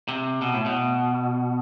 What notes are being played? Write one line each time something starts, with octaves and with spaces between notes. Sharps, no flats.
C3
B2
A2
B2